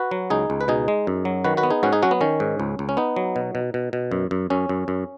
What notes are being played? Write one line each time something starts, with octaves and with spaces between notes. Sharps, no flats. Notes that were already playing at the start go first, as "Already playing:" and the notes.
Already playing: F#4 B4
F#3
C#2 D#4 G#4
C#2
B4
B2 D#4 G#4
G#3
F#2
F#3
D#3 F#4 B4
F#4 B4
B3
D#4 G#4
G#2 C#4 F#4
D#4 G#4
F#3 C#4 F#4
B3
D#3 C#4
G#2
C#2
C#2
C#4
B3 D#4
F#3
B2
B2
B2
B2
F#2
F#2
F#2 C#4
F#2
F#2